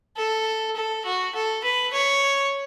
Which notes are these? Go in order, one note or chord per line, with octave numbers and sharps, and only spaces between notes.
A4
A4
F#4
A4
B4
C#5